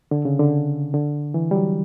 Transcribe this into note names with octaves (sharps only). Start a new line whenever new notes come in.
D3
C#3
D3
D3
E3
G3
F#3